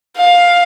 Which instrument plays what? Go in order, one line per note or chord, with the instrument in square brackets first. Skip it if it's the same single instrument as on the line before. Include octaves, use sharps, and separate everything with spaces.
[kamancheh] F5